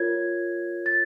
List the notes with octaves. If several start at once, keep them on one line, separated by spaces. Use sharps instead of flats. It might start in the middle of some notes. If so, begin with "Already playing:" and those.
Already playing: F4 A#4 C#5 G#6
A6